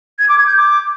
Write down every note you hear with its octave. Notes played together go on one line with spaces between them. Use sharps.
G#6
D6
G#6
G6
D6